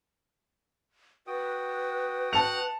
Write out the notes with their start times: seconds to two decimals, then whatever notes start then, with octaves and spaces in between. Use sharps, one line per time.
1.27 F#4 B4 G5 D#6
2.33 F#5 A5 F7